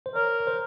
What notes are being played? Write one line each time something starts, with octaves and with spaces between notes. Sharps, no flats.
C5
A#4 C#5
C5